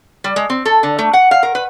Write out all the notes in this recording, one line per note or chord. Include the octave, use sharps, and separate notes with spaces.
G3
G#3
C4
A4
D3
A3
F#5
F5
A#4
B4